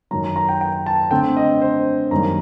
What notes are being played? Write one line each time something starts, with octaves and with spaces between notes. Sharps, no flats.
F#2 D#3 F#3 A#5
A#5
A#5
G5
G5
A5
D3 A3 C4 G5
D#5
C5
F#2 D#3 G3 A#3 A#5